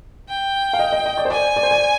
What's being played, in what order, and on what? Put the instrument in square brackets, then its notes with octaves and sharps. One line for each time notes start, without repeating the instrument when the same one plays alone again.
[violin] G5
[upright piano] F5
D#5
D#5
D#5
D5
C5
[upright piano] D5 [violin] G#5
[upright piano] D5
C5
D5